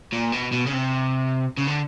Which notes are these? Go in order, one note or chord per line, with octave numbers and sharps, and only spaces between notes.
A#2
B2
B2
C#3
C3
C#3
D3